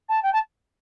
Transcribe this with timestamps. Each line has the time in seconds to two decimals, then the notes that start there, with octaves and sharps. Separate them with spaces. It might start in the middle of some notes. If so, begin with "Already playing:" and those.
0.09 A5
0.23 G5
0.33 A5